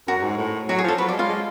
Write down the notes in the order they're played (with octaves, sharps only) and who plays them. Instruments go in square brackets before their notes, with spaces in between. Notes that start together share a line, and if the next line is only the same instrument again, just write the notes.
[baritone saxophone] F#2 [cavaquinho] F#4
[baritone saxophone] F#2
G#2
A2
[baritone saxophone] F#3 [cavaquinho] F#4
[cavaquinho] G#4
[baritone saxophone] F3 [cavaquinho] A4
[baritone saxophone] F#3 [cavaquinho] B4
[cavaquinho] D5
[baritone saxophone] G#3
[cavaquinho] F4 F5
[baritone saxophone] G#3